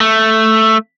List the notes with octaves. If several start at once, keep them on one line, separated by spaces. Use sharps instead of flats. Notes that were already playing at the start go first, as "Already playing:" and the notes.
A3